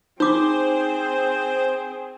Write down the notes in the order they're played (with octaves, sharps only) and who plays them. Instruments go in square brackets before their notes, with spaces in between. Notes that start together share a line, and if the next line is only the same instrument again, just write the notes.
[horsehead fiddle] C4 G#4 [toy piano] D#4 D6 [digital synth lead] C5